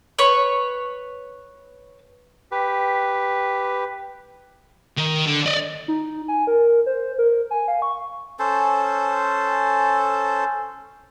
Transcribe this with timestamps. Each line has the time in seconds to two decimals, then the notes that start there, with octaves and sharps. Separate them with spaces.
0.19 B4 C#5 C#6
2.52 G4 B4
4.98 D#3
5.26 D3
5.46 D5 D#5
5.88 D#4
6.28 G#5
6.47 A#4
6.86 C5
7.18 A#4
7.51 G#5
7.68 F5
7.82 C#6
8.39 C#4 A4 C5